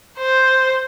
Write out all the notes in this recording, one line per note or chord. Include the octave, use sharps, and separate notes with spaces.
C5